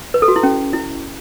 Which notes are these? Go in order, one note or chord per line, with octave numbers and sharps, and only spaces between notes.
B4
A4
F#4
E4
C#4
E4